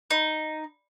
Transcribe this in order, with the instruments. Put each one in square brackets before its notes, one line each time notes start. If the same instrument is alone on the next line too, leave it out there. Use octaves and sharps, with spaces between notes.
[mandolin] D#4